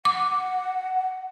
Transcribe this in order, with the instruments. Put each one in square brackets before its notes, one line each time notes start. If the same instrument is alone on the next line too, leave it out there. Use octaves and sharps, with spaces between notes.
[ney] F#5 [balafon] D6